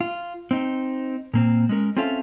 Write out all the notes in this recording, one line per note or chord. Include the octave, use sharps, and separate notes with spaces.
F4
C4 D#4
A#2 A#3 C4
G#3 C#4 A#4
C4 C#4 F4 A4 E5 F5